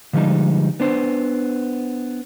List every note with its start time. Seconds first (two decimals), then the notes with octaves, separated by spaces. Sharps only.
0.13 D3 F3 G3 G#3 D#4
0.80 B3 D4 C5